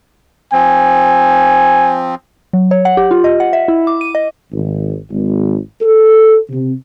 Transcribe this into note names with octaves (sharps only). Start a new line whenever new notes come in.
F3 C4 G#5
F#3
C#5
F#5
G4
F4
D#5
F#5
E5
E4
D6
D#7
D#5
G#1
G#1
A4
C3